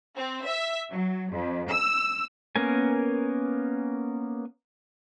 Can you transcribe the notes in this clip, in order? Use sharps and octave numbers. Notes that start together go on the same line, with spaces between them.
C4
E5
F#3
F2
E6
A#3 B3 C#4 A#4 G#5